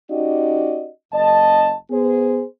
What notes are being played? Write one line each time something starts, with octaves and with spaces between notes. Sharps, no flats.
C#4 D#4 F#4 G4 D5 D#5
F#1 D#5 A5
B3 G#4 C5